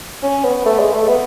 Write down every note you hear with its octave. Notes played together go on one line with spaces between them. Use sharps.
C#4
B3
A3
G#3
A3
B3